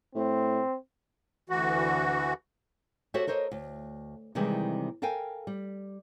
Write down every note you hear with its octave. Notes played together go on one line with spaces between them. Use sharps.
A2 C4
D2 E3 F#4
F#4 G4 A4 C5 C#5 E5
A4 A#4 C5 C#5 D#5
D2
C3 D#3 E3 G3 G#3 C4
A4 A#4 F5 G5 G#5
G3